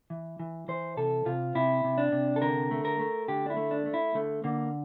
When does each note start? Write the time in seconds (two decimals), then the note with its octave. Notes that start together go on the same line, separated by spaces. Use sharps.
0.10 E3
0.39 E3
0.68 E3 C5
0.97 C3 A4
1.25 C3 F4
1.55 C3 E4
1.84 C3
1.98 D4
2.12 C3
2.36 A4
2.42 D3 A#4
2.71 A3
2.85 A#4
2.99 A3
3.28 D3 G4
3.46 D4
3.50 E4
3.57 A3
3.71 D4
3.86 A3
3.94 E4
4.15 D3 A3
4.44 D3 A#3